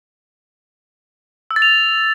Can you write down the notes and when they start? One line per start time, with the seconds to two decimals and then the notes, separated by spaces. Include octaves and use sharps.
1.51 E6
1.56 A6
1.62 F7